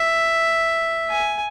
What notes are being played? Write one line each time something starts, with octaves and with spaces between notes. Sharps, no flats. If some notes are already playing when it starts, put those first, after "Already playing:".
Already playing: E5
G#5